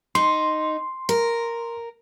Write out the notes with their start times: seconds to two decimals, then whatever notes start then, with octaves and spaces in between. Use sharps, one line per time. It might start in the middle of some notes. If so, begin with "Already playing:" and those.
0.15 D#4 C6
1.09 A#4